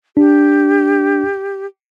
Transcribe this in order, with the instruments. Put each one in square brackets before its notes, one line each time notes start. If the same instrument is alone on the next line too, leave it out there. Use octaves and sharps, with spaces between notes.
[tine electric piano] D4 [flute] G4